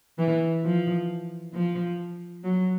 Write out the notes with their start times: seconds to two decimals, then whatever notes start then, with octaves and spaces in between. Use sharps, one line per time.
0.18 E3
0.63 F3
1.53 F3
2.44 F#3